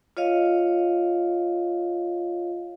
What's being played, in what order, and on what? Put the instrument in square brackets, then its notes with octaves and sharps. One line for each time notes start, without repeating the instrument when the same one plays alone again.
[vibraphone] F4 C#5 D#5 F5